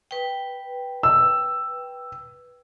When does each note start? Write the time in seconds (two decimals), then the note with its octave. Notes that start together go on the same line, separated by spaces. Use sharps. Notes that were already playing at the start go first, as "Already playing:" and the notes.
0.11 B4 G5
1.03 E6